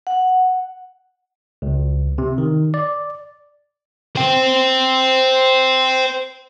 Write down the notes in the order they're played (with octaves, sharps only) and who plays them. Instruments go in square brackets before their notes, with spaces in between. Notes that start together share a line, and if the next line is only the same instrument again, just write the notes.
[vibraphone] F#5
[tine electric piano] C#2
C3
D#3
D5
[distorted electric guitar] C5 G5